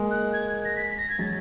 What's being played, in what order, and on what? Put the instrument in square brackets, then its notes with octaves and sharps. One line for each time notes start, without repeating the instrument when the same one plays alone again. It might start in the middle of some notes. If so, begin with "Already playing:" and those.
Already playing: [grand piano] G#3 A#3
[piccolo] F#6
G#6
A#6
B6
B6
A#6
G#6
[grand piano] F#3 G#3 [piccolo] A6